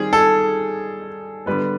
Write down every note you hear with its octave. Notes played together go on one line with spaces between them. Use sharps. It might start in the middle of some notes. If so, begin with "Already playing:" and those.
Already playing: D#3 G3 C4 G#4
A4
D3 G3 B3 B4